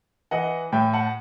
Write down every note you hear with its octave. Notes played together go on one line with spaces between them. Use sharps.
E3 D#5 F#5
A2 E5 G5
F#5 A5